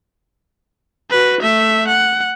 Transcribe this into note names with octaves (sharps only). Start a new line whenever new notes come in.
F#4 B4
A3 E5
F#5